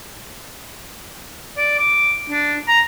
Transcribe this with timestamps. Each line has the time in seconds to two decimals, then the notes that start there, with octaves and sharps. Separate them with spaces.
1.57 D5
1.79 D6
2.30 D4
2.68 A#5